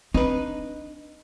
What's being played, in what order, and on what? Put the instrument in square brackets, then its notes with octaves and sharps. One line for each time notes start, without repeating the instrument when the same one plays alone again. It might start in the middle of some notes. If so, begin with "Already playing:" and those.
[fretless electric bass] C4 [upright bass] D4 [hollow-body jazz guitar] D#4 B4